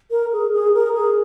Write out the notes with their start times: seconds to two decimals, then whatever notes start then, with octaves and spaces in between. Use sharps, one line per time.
0.11 A#4
0.33 G#4
0.53 G#4
0.74 A#4
0.95 G#4